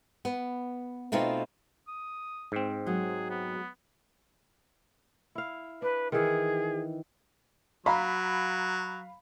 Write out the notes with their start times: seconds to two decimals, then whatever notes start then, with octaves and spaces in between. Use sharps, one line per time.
0.25 B3
1.12 B2 A3 C4 D#4 F4
1.88 D#6
2.52 G#2 C4
2.86 F#3 G#3 G#4
3.30 B3
5.35 E4 F5
5.82 D4 B4
6.12 D#3 E3 G#4
7.86 F#3 F5 A#5 B5